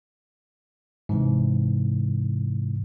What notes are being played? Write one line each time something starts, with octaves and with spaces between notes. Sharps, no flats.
G#2 C3 E3